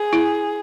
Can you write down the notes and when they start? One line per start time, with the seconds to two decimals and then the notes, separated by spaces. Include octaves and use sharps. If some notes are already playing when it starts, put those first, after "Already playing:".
Already playing: G#4
0.13 E4